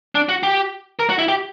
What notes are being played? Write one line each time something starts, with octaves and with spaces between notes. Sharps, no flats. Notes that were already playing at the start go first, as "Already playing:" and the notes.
D4
F#4
G4
A#4
F#4
E4
G4